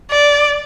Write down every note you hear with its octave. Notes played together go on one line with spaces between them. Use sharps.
D5